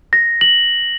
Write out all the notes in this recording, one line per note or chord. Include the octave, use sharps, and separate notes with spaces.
A#6
F#7